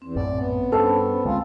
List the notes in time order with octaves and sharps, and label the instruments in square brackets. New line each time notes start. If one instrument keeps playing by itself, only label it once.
[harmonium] E2 [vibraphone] C4
[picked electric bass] A#1 F#2 A2 [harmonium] D5
[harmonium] B3
[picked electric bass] G2 [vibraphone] C#4 C5 B5 [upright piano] A4
[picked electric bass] D2 G#3 C4 [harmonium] F4